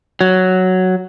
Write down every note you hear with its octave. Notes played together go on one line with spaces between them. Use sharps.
F#3